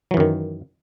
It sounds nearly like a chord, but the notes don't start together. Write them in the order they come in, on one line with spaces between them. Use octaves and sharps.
F#3 E3 F#2 D#3